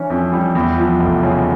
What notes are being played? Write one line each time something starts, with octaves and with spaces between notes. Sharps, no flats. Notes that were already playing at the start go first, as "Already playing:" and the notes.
Already playing: E3 C#4 D4
F2
G3
E2
F3
F1
C#3